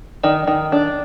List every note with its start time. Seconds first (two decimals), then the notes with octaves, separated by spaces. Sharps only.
0.24 D#3 D5
0.47 D#3
0.72 D4